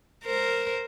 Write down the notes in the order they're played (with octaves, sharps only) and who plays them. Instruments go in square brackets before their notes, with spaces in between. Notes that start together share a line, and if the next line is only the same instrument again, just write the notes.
[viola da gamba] A#4 C5